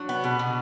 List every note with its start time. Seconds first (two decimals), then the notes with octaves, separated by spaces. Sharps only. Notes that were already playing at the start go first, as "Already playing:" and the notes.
Already playing: F#3 D4
0.09 B3
0.24 B2
0.39 B2